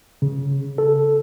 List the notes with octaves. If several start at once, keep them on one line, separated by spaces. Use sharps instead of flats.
C#3
A4